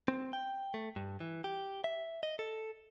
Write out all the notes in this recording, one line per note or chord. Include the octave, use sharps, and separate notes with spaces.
C4
G5
A3
G2
E3
G4
E5
D#5
A4